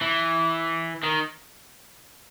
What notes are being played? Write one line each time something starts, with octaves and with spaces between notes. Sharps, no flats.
E3
D#3